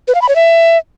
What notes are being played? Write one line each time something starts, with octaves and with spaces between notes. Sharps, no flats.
B4
F5
B5
C#5
E5